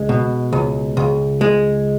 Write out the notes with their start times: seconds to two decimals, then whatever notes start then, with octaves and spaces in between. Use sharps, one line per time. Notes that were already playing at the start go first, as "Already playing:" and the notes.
Already playing: C#2 G#3
0.09 B2
0.53 C#2
0.97 C#2
1.41 G#3